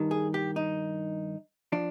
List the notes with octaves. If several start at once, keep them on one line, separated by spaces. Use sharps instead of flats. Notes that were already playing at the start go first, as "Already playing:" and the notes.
Already playing: G2 D#3
G#4
G4
D#4
F3 D4